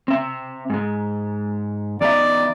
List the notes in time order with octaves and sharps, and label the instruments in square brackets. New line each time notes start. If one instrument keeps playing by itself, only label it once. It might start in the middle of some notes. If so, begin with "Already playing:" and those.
[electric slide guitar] C4 E5
G#2 G#3
[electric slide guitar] E2 D#4 E5 [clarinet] D5